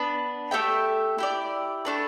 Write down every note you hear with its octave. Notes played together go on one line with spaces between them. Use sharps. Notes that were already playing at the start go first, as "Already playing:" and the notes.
Already playing: B3 D4 B4
A3 G4 E5 G5
E4 G4 D5
A3 D4 B4